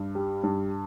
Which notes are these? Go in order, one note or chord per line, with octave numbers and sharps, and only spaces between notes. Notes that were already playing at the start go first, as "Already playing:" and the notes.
Already playing: G2
G3
G2